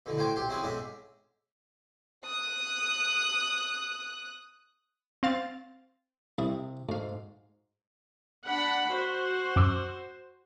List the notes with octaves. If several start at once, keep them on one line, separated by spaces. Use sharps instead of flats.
B2 D3 E3
A2 F#4 C5 G5 G#5 D6
B1 G4 C6
C4 C#4 E4 F#4 G#4 B4
B1 G#2 C#4 D4 E5
D#6 F#6
C4 F5 A6
C2 C3 E4 D#5
D2 G#2 F5
D4 F#5 B5
F#4 C5
F#2 D6 E6